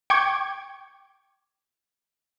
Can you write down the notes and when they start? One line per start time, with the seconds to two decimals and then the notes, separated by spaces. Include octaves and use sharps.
0.10 G5 C#6 D6 G#6